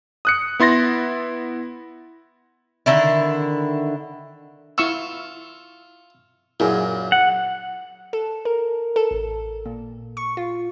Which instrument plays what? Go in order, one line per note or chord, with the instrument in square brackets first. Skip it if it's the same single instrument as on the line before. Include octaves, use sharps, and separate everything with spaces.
[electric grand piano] D#6 F#6 C#7
B3 E4 C6 A6 A#6
[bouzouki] D3 D#3 E4
[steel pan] E4 C#6 E6 [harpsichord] F4
[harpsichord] F#2 A#2 [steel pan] E4 G#4
[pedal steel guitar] F#5
[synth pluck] A4
A#4
A4
A1
A#2
C#6
F4